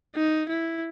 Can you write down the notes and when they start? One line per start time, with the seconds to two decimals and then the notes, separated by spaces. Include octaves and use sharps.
0.15 D#4
0.49 E4